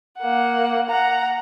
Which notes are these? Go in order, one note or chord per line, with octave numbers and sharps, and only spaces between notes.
A#3 F#5
F#5 A#5